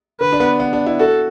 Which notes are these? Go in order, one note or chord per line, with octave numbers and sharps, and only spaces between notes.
D3 B4
D4
B3
B3
D4
E4
F#4 A4